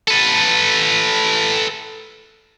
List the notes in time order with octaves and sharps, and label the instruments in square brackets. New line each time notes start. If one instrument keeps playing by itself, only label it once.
[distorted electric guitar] A4 B4